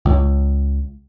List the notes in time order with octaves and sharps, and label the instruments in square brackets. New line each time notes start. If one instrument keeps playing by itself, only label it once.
[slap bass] C#2